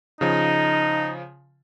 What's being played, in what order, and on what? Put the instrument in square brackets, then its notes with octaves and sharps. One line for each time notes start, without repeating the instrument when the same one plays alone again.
[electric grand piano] C#3 F3 [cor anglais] D#4